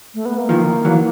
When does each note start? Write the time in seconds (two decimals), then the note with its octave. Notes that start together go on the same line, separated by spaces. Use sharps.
0.14 A3
0.25 B3
0.37 A#3
0.49 D#3 F3
0.85 E3 F#3